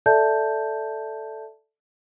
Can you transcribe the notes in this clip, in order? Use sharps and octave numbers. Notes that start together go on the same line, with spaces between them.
A4 D5 E5 A5 G6